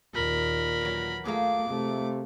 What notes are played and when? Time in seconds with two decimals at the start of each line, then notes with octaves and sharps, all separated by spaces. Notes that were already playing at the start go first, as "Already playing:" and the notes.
0.14 D#2 A#2 A#4 B5
0.81 E3 F#3
1.25 A3 A#3 F4 G#4 D6
1.69 C3 A3